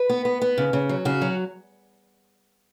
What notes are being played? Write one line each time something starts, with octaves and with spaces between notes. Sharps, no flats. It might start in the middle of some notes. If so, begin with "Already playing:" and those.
Already playing: B4
B3
B3
B3
C#3
C#3
F#3
C#3 F#4
F#3